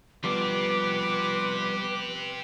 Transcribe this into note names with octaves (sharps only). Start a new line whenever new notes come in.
F3 G3 B3 G4 B4 C5 D6